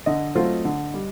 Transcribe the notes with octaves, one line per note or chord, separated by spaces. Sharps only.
D3 D#5
F#3 A3 C4 F4
D3
G3